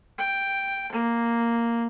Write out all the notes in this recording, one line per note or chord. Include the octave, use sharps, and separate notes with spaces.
G5
A#3